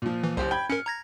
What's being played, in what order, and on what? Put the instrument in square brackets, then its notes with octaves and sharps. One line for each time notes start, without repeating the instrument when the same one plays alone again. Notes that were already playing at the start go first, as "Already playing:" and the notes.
[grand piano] A#2 F3
[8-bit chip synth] E3
[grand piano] F#1 G4 C5 [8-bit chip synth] C2
[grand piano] G5 B5 G#6
[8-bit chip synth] C#4 A#4 [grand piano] F6 C#7
[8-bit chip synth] A#5 G#6 A#6